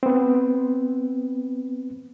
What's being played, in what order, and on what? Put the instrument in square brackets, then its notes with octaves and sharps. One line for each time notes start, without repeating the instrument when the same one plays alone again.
[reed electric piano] B3 C4